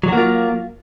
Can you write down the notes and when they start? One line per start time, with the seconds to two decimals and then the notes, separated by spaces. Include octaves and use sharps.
0.04 F#3
0.08 F#4
0.13 A#3
0.17 F4